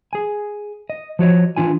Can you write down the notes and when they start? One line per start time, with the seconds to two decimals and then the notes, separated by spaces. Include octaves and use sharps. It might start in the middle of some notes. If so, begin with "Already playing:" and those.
0.13 G#4 G#5
0.90 D#5
1.19 F3 F#4 C#5 D#5
1.56 E3 D4 F4 G#5